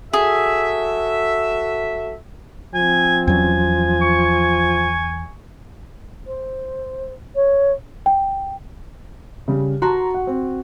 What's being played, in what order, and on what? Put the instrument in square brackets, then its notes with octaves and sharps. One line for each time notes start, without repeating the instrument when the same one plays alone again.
[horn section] F#4 A4 E5 [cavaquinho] G#4
[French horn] F3 [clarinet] C4 [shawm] G#5
[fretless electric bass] E2 F#3 C#4 [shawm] G#5
[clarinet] C#6
[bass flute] C5
C#5
[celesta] G5
[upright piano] C#3 G3
[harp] F#4 [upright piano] A5 A#5 C6
[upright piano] F#5
C4